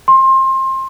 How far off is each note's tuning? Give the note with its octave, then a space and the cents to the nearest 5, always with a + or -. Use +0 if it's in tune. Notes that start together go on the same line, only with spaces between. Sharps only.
C6 +25